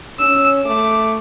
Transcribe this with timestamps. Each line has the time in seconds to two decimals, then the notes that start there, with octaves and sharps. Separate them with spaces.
0.19 C#4 E6
0.65 A3 D6